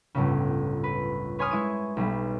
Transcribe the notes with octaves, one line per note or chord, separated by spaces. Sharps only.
G1 C#2 A2 C#3
B4
B4 C#5 G#5 C6 D#6 F6
G#3 E4 C#6 D#7
B1 G3